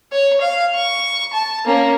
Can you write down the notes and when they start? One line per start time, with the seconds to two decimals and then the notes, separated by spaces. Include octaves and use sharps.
0.12 C#5
0.41 F5
0.75 C#6
1.33 A5
1.65 A#3 C#4